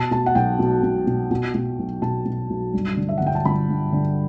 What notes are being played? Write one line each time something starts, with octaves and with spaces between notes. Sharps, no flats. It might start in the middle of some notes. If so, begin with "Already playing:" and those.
Already playing: B2 A5
B2 A5
F#5
B1 G5
B2
B2
B2
B2
B2
B1
B2 A5
B2
B1
G2
D3
E5
G1 F#5
G5
A5
G1 B5
G2
D3